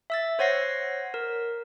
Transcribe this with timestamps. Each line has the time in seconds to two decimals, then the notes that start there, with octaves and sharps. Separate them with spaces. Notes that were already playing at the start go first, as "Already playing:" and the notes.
0.10 E5 E6 A6
0.39 C5 C#5 F#5 A#6 C7
1.14 A#4